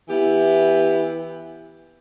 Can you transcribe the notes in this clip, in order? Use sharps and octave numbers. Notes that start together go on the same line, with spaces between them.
E3 B3 E4 G4